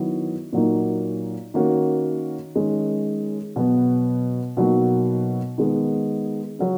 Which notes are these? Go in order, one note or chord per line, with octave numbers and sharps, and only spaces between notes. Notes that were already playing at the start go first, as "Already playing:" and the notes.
Already playing: D#3 F#3 B3 E4
A#2 F#3 A#3 D#4
D#3 A#3 C#4 F#4
D#3 G#3 C#4
B2 F#3 B3
B2 F#3 A#3 D#4 F#4
D#3 G#3 B3
C#3 F#3 C#4